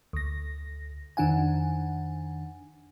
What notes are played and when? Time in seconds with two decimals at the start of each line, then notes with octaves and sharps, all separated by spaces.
0.13 D2 A#6
1.17 F2 D#3 D4 F#5 G#5